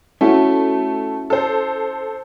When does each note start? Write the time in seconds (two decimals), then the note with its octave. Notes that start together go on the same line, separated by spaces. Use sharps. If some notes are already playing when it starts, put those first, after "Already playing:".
0.21 A3 C#4 E4 F#4
1.30 A4 C5